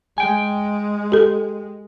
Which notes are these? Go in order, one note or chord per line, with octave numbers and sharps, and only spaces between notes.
G#3 G5 G#5
G4 A4